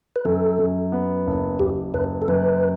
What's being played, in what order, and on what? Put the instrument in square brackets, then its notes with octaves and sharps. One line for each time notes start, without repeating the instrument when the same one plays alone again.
[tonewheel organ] B4
[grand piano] F#2 [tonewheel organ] A4
[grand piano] F#2
B3
F#1
[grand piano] F#1 [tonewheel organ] G4
[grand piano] F#1 [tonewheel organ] B4
[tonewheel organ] A4
[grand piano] F#2 [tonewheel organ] B4